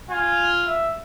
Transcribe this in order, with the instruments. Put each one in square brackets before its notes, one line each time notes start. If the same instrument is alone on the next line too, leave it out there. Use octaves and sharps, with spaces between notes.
[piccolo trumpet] F4 [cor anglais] G#5
[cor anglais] E5